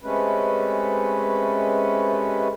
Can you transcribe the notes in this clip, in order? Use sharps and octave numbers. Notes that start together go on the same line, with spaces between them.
C3 G#3 A3 C#4 B4